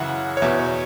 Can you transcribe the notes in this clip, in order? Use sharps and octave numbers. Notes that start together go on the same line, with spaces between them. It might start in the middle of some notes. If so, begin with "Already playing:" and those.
Already playing: F#2 C#3 E3 E5 F#5
C#5
E2 B2 E5
C#5